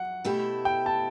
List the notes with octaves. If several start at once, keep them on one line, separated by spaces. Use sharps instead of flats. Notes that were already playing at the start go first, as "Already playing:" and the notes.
Already playing: F#3 F#5
B2 A3 E4 G4
G5
A5